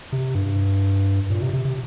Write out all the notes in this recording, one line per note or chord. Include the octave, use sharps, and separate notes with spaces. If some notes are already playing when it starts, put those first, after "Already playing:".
C3
G2
A#2
C3
C3
C3